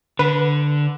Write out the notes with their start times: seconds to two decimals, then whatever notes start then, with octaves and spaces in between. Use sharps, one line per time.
0.19 D3 B4